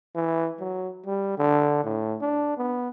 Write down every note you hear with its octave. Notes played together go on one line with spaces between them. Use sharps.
E3
F#3
G3
D3
A2
D4
B3